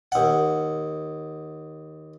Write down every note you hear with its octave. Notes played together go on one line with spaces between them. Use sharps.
D#2 F#5